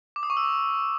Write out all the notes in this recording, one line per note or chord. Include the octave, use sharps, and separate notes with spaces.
D6
D#6
C#6
E6